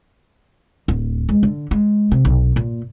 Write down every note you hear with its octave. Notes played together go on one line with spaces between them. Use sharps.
D1
G#3
D3
G#3
C3
B1
A#2